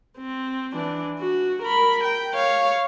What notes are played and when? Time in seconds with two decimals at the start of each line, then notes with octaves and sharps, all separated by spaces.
0.18 C4
0.74 E3 D4
1.20 F#4
1.63 A#4 B5
2.04 G5
2.34 C#5 F5